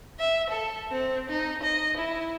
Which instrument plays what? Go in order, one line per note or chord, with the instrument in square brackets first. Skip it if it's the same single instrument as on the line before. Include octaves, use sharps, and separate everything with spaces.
[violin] E5
A4
C4
D#4
D#5
E4